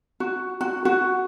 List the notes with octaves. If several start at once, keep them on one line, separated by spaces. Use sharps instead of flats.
F#4
F#4
F#4